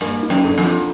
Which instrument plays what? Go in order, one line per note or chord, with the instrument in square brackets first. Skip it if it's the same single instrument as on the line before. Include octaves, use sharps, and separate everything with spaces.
[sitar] G2 [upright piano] A#3
[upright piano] D#4
[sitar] F#2
[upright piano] D3
[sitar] F2
[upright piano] F3